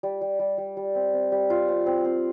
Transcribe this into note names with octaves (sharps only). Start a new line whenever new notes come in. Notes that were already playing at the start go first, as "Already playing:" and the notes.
G3
G3
G3
G3
G3
C4
C4
G3
F4
C4
C4
C4